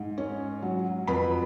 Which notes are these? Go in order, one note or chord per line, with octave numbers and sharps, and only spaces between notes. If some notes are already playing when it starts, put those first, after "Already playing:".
Already playing: G#2
C#4
F#3
F2 B4 B5